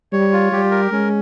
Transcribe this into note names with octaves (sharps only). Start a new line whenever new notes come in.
G3 C#5
F4
G3 G4
A#4
G#3 C#4